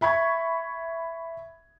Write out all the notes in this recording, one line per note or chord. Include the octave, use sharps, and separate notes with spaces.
E5 B5 C#6 G#6